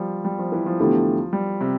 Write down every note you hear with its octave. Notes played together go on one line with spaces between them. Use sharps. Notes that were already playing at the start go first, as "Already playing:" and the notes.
Already playing: F3 G3
G3
F3
E3
F3
E2 D3 A3 E4 G4
G3
C3